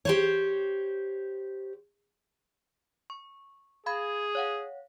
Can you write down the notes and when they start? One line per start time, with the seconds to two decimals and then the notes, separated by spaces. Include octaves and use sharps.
0.05 G4 C5 C#5
3.10 C#6
3.86 G#4 F5 B5 G#6
4.35 C#5 F5 F#5